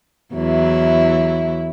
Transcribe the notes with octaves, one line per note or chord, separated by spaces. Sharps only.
E2 F#3 E4